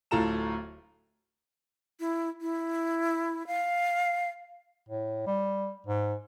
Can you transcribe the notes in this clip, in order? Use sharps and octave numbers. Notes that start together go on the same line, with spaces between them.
D1 A2 F4 A4 A#5 E7
E4
E4
F5
A2
G3
G#2